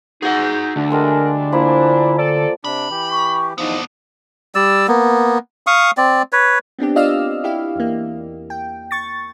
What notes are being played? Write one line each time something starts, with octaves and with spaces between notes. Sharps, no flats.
D#4 F#4 G#4 E5 F#5
D2 D4
G3 G#3 A4 A#4
F3 A#3 E4 G#5
A4 D5
C3 D4 B5
E3 G4
C#6
E2 F3 B3 D4 D#4
G3 D5 E6
A#3 B3
F5 C#6 D#6
C4 D5
B4 C#5
B3 C4 D4 G4
F4 D5 D#5 F5 E6 F6
E4 G4 F5
E2 A#3
G5
C#6 A6